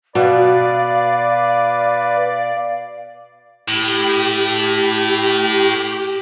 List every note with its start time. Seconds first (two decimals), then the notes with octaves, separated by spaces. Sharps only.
0.15 B2 B4 D5 F5
3.68 A2 G4